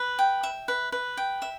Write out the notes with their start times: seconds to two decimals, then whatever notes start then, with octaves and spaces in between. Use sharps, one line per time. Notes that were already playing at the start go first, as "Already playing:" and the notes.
Already playing: B4
0.19 G5
0.43 E5
0.68 B4
0.92 B4
1.17 G5
1.42 E5